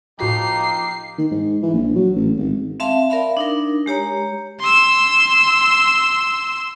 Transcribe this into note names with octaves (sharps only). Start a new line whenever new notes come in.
A2 F3 A#3 D#4 F#4 G4 C7
D#3
G#2
E3
A#1
F#3
A1
G#1
C4 E5 F5 A5 C6
A#4 D5 E5 F5 B5
D4 D#4 A#4
G#3 G4 C#5 A#5
C6 E6